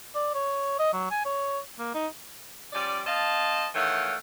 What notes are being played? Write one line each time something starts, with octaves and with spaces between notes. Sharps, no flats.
D5
C#5
D#5
F#3
G#5
C#5
A#3
D#4
F3 G3 C#4 D5
C4 D#5 F5 A5
D#3 E3 A3 C#5 F5 F#5